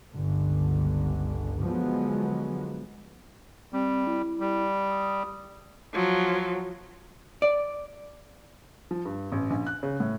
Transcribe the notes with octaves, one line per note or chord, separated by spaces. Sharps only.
G1 C#2 D3
D3 F3 F#3 G#3 B3
G3 C4
E4
G3
D#6
F3 F#3
D5
F3
G2
A1
A#1
F#6
C#3
A2